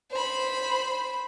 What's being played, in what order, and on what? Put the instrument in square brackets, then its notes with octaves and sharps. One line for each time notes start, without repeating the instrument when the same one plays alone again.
[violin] C5 B5